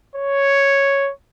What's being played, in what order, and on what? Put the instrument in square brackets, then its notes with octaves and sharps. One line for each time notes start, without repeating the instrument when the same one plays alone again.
[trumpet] C#5